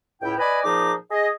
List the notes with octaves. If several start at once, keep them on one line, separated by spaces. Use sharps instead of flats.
C#2 A2 E4 G5
B4 D5 D#5 G#5 B5
A#2 F3 D#4 G#4 D6
G#4 D#5